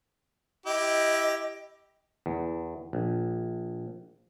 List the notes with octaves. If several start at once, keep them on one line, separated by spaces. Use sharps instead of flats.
E4 G4 D#5
E2
A#1